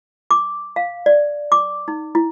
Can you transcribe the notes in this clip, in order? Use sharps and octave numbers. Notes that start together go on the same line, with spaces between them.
D6
F5
D5
D6
D#4
E4